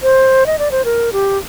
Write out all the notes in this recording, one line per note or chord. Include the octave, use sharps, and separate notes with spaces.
C5
D#5
D5
C5
A#4
G4